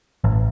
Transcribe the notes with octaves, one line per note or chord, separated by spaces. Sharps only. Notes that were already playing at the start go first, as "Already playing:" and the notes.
A1